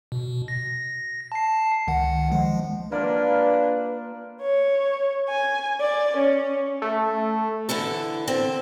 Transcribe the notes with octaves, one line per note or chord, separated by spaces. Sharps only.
B2
A#6
A5 C7
C#2 D#3 F#5
F3 G#3
A#3 D4 F4 B4
C#5
G#5
D5
C#4
A3
D3 E3 E4 A4
D3 C4